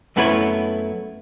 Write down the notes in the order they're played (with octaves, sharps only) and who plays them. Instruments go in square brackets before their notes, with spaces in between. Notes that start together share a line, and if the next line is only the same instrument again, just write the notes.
[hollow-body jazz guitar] F#2 A3 B3 E4 B4 C#5